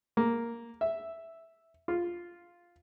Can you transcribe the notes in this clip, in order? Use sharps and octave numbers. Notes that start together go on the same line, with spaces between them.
A#3
E5
F4